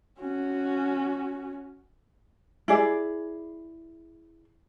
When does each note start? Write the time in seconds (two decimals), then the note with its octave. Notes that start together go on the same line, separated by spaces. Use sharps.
0.20 C#4 F#4
2.68 E4 G#4 D5